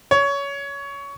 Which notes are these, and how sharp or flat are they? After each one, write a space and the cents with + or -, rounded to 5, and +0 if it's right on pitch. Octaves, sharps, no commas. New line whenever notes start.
C#5 +20